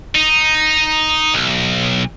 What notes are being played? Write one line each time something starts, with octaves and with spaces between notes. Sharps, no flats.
D#4
B1